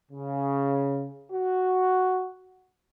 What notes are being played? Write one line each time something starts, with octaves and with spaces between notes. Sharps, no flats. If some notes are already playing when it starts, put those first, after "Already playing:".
C#3
F#4